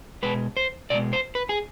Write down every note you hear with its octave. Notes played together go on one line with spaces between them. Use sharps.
B2 G#3 B4
C5
B2 G#3 D5
C5
B4
G#4